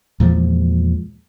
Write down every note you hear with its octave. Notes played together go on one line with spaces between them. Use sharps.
E2 A#2 F3 G#3